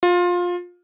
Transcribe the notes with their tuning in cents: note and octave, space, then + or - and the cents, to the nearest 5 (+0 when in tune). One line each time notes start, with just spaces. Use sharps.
F4 +20